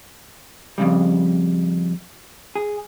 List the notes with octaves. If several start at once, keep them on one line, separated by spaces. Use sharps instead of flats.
F2 A#2 C#3 G3
G#4